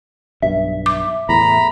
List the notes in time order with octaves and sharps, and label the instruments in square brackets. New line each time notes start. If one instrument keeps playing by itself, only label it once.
[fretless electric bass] B1 G2 [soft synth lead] E5
[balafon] D6
[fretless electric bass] E2 A2 [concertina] A#5 B5